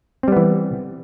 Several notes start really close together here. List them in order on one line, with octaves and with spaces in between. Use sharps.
C4 G3 B3 E3